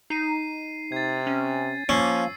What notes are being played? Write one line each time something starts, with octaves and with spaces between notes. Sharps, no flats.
D#4 C7 D#7
C3 G#6 A6
C#4
F3 A#3 C#4 E6 C7